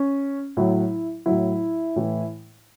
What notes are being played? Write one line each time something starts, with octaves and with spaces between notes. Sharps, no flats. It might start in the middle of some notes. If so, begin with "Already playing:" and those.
Already playing: C#4
A2 F#3 E4
F#3 E4
A2
A2 E3